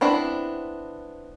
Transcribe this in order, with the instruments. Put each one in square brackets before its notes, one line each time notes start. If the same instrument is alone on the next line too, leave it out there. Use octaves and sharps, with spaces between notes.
[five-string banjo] B3 C4 D4 E4